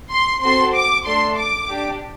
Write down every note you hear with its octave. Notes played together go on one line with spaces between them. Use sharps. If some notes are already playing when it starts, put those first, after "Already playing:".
C6
C4 F#4 A4 C6
D6
A3 D4 A4 C6
D6
D4 G4